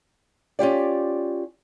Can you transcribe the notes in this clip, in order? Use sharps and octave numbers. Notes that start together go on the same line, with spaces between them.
C#4 F4 G4 D5